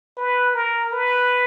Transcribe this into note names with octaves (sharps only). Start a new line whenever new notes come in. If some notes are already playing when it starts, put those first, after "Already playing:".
B4
A#4
B4